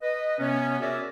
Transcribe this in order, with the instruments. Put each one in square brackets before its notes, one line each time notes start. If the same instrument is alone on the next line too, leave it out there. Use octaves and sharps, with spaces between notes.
[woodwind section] B4 D#5
C3 B3 C#4
F#4 G#4 A#4 D5 E5